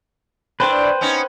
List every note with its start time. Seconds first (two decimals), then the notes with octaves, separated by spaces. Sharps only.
0.60 A2 D4 B4 C5 G5
1.01 B3 C#4 D#4